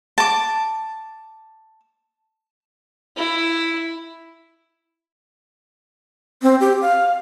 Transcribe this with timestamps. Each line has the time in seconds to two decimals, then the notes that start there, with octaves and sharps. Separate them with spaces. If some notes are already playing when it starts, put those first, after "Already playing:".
0.18 A5 D6
3.17 E4
6.43 C4
6.61 G4
6.81 F5